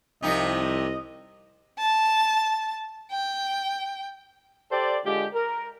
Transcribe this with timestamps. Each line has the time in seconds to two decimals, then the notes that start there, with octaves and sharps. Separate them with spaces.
0.23 C2 C3 F3 D#4 D#5
1.78 A5
3.10 G5
4.72 G4 A4 C5 D5
5.05 D3 G#3 F4 G4
5.34 A#4